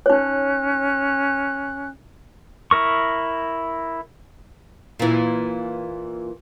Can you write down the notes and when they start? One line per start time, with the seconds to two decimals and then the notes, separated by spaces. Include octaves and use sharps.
0.06 C#4 D#4 C#5 F#6
2.71 E4 A#4 C#6
5.00 A#2 E3